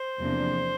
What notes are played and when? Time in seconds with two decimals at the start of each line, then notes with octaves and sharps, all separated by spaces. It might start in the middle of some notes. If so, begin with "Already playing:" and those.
Already playing: C5
0.19 E2 C3 F3 A#3 D4